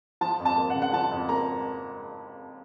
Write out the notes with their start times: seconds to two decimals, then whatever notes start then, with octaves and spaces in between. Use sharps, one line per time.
0.21 F3 A5
0.40 F2
0.45 A5
0.58 A#3
0.70 F#5
0.75 C#3
0.82 F#5
0.93 F3 A5
1.11 F2
1.29 A#3 A#5